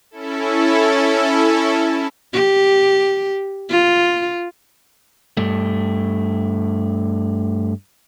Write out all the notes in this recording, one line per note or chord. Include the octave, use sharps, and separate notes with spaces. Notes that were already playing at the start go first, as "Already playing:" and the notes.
C#4 E4 A4
G4
F4
G2 A3